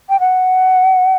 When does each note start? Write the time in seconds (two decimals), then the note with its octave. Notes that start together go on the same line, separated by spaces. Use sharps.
0.09 G5
0.20 F#5